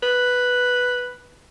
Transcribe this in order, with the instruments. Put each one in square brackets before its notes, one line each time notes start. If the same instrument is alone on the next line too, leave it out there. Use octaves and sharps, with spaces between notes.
[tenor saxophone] B4